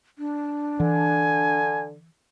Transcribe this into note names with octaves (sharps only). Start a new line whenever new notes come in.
D4
D3 E3 G#5